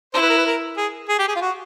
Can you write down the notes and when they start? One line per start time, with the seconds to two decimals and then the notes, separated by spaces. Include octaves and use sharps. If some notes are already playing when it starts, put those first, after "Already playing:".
0.14 E4 C5
0.22 B4
0.29 A#4
0.37 B4
0.46 A#4
0.77 G#4
1.09 G#4
1.19 G4
1.28 G#4
1.36 F4
1.41 F#4